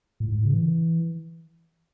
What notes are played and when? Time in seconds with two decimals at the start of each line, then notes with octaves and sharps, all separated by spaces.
0.20 A2
0.28 G#2
0.36 A2
0.45 C#3
0.53 E3